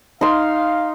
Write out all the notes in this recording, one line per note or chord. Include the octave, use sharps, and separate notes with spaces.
D#4 F5 C6